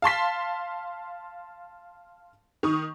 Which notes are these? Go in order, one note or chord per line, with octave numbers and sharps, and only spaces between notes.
F5 A5 C6 B6
D#3 C#6 D#6